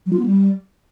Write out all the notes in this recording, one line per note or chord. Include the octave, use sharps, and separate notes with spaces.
F#3
F4
B3
G3